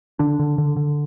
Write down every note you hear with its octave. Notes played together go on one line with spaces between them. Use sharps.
D3 D4
D3
D3
D3